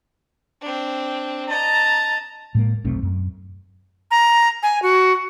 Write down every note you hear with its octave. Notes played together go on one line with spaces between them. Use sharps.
C4 D4
D#5 A5 A#5
A2 G#3 A#3
F1 B1 A3 C4
F#2
A#5
G#5
F#4